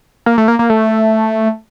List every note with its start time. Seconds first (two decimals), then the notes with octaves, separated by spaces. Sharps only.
0.26 A#3
0.38 A3
0.48 A#3
0.59 A#3
0.70 A3